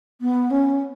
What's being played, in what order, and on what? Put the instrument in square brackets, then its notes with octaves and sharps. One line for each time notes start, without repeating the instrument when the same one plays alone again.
[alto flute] B3
C#4